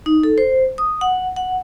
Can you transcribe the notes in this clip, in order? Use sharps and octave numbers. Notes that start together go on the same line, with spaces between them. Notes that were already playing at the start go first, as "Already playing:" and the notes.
D#4
A4
C5
D#6
F#5
F#5